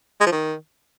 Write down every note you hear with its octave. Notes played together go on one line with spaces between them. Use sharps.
G#3
F3
D#3